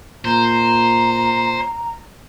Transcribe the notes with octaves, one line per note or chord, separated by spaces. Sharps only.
A#2 C5 A#5